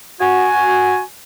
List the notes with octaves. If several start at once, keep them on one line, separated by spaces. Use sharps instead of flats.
F#4 G#5